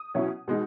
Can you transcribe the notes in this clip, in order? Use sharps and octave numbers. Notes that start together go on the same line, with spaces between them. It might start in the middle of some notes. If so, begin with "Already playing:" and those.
Already playing: D#6
B2 F#3 C#4 E4
B2 G#3 D#4